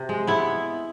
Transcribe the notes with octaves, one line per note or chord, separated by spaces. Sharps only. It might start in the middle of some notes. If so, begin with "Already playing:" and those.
Already playing: C3
G#3
B3 E4